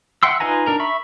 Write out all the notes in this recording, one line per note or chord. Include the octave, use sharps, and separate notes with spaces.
E5 F#5 G5 C6 E6
D#4 F4 B4 G#5 A#5
D4 A#4 A#5
E5 B5 C#6